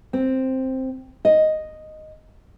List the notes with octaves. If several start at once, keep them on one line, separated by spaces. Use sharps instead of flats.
C4
D#5